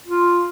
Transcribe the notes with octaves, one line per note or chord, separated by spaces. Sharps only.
F4